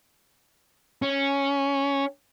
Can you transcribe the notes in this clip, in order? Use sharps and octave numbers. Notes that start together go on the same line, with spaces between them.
C#4